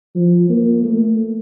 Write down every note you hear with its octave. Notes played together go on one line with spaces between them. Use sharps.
F3
A#3
A3